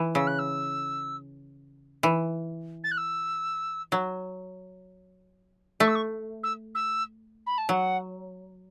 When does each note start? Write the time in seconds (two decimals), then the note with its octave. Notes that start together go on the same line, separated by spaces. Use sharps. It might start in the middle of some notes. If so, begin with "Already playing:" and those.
Already playing: E3
0.15 C#3 E6
0.27 F#6
0.39 E6
2.03 E3
2.84 A6
2.91 F#6
2.97 E6
3.92 F#3
5.80 A3 C#6
5.88 E6
5.95 C#6
6.43 E6
6.75 E6
7.46 B5
7.58 A5
7.69 F#3 F#5